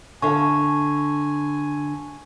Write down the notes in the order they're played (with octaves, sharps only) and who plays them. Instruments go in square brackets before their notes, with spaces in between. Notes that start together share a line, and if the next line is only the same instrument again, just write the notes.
[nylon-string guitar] D3 E5 F5 [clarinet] G#5 [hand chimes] A5 C#6